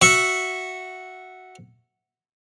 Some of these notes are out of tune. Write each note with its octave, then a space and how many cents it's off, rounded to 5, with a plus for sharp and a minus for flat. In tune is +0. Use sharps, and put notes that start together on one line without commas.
F#4 +0 E5 +0 C#6 -10